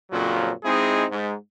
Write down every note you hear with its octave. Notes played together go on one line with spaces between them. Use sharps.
F2 A#2 C#3 F3 F#3
G#3 C4 D#4 E4 G#4
G#2